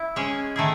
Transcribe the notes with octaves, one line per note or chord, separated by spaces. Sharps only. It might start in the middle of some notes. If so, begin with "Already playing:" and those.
Already playing: E4
G#3 C#4 G#4
D#3 A3 E4 G#4